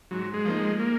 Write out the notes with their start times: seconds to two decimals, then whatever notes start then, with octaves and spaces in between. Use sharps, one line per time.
0.11 G#2 F#3
0.34 G#3
0.45 F3 A#3 D#4
0.56 G#3
0.79 A#3